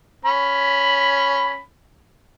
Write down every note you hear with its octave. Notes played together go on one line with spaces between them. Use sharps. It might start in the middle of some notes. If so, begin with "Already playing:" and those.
C#4 B5